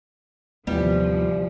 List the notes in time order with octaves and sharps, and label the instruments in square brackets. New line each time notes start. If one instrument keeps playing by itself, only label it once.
[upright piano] D#1 A1 C3 [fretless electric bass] D#2 B3 [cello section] F3 [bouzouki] G3